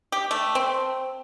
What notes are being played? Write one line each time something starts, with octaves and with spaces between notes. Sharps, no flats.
G4
A3
C4